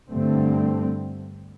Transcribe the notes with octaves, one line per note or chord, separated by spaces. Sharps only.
G2 D3 A3 C4